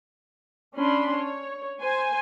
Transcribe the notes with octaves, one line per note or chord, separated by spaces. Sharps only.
C#4 D4 B5 C6
C#5
C5 G#5